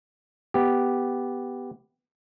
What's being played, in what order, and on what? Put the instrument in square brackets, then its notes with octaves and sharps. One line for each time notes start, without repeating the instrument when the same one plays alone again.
[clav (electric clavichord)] B3 G4